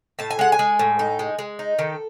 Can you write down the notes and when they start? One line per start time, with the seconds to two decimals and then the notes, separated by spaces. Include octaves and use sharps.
0.19 A2 A5
0.30 G#5
0.39 G#3 F#5
0.52 G#5
0.59 G#3
0.79 A2
0.99 D#4
1.19 G#3
1.39 G#3
1.59 D#4
1.79 D#3 A4